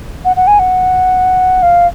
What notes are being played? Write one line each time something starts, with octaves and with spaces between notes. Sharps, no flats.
F#5
F#5
G#5
F#5
F5